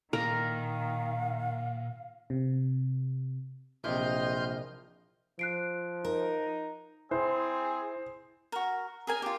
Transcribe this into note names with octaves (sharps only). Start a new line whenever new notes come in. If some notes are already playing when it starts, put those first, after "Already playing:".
A#2 D#3 A#4 F5
C3
A#1 C3 E3 D#5 C6 F6 G6
F3 F#6 C7 D7
D#4 A#4
C4 E4 G#4 C5
F#4 A#4
G#4 A#4 G#5
F4 G4